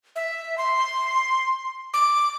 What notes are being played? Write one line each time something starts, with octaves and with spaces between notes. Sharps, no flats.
E5
C6
D6